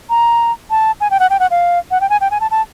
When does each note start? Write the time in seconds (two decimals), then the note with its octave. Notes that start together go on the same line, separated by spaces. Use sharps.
0.10 A#5
0.70 A5
1.01 G#5
1.11 G5
1.20 F#5
1.30 G5
1.40 F#5
1.51 F5
1.91 F#5
2.01 G5
2.10 G#5
2.21 G5
2.31 G#5
2.41 A5
2.51 A5